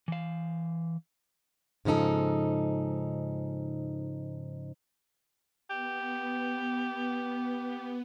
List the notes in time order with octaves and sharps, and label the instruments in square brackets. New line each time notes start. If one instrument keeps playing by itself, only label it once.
[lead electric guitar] E3 F5
[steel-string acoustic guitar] G#2 C#3 F3 D#4 A4
[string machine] B3 [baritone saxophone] G4